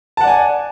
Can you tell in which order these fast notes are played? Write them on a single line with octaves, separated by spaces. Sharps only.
A5 F#5 D5 G#5